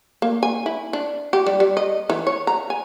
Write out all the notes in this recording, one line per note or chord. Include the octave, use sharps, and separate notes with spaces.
A#3
G#5
E4
D4
G4
G3
G3
D#5
E3
C#5
A#5
G#5